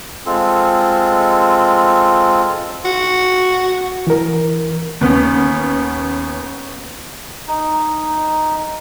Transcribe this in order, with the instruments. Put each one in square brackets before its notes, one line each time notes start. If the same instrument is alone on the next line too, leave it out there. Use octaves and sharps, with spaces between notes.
[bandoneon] G#3 C4 F4 A4
[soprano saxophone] F#4
[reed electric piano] E3 A#4
[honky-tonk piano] D#2 B3 C#4
[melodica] D#4